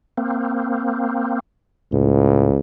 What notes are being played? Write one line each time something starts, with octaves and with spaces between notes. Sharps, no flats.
A#3 C4
C#2 A2